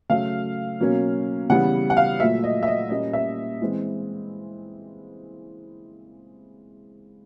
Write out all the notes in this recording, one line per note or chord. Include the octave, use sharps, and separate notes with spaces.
C#3 F#3 A3 F5
B2 F#3 A#3 C#4
C#3 E3 G3 B3 F#5
F#5
F5
A#2 F#3 A3 E5
D#5
E5
D#5
A#2 G3 A#3 C#4 D#5
E5
E3 G#3 C4